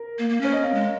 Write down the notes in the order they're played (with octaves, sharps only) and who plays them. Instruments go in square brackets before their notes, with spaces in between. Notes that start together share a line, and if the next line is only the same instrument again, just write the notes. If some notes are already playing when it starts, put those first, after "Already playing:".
Already playing: [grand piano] A#4
[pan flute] A#3
A#3
[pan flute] C#4 [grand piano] C#5
[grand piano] D#5
[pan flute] C4 [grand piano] F5
[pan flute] G#3